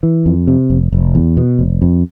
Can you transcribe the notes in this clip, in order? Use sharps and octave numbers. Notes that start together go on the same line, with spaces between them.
E3
F2
C3
F1
F1
E2
B2
F1
F2